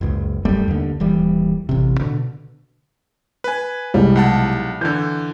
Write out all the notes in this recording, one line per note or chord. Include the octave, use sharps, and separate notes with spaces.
F#1 C#2
D#1 F#2 G3 A3
D#2 D3
D#1 E3 G3
A1 C3
B2 D3
B4 G#5
C2 G3 G#3
B1 F#5 A5
D3 E3 G6